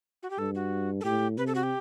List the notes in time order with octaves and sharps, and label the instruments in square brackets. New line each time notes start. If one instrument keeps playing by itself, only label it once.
[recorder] F#4
G4
[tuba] G2 [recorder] A4
[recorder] F#4
A4
[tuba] A2 [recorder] G4
[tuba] C3 [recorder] B4
[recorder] A4
F#4
G4